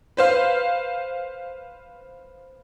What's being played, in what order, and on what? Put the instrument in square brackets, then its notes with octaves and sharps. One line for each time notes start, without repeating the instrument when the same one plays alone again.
[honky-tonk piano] B4 C5 F5